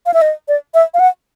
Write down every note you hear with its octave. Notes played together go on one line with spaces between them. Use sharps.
F5
E5
D#5
D5
E5
F5
F#5